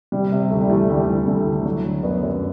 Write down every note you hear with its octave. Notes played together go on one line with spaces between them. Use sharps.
C3 G3
C3
D2 A3
G3
E3 A3
D2 G3
E3
D2 A3
D2
F#3
D3
F#2 B3
F#2